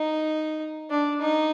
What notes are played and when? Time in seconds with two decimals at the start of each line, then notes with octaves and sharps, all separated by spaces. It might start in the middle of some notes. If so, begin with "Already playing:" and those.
Already playing: D#4
0.90 D4
1.21 D#4